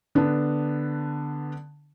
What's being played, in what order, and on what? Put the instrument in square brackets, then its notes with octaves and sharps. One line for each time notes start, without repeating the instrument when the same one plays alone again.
[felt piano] D3 B3 D4